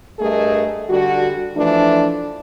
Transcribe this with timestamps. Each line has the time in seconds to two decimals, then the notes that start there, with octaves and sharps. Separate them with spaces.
0.19 G2 A3 G#4 A#4 D#5
0.89 D3 G3 F#4
1.56 E3 F3 A3 D4